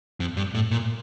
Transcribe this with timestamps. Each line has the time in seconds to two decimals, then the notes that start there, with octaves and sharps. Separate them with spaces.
0.20 F2
0.37 G2
0.55 A2
0.71 A#2